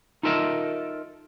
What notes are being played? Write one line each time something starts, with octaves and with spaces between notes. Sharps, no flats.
D#4 F4 A4 A#4 D#5 E5